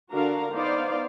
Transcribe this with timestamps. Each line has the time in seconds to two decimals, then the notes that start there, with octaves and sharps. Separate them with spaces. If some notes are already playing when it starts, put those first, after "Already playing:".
0.11 D3 D4 F#4 A#4 F5 A#5
0.53 B3 D#4 C5 D5 F5